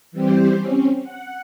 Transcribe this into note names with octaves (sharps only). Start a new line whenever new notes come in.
E3 G3 C4 G4 C5
C4 C#4
F#5